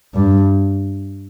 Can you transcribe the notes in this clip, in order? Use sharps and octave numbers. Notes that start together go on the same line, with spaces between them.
G2